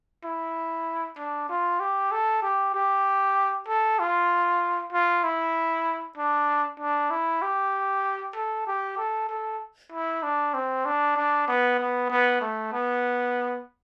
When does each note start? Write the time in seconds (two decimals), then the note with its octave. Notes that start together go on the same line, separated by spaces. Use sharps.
0.24 E4
1.18 D4
1.49 F4
1.80 G4
2.12 A4
2.42 G4
2.74 G4
3.68 A4
3.99 F4
4.93 F4
5.24 E4
6.17 D4
6.80 D4
7.11 E4
7.42 G4
8.35 A4
8.67 G4
8.98 A4
9.29 A4
9.92 E4
10.23 D4
10.54 C4
10.86 D4
11.16 D4
11.48 B3
11.79 B3
12.10 B3
12.41 A3
12.72 B3